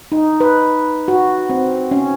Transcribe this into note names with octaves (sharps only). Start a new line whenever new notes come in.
D#4
B4
F#4
C4
C#4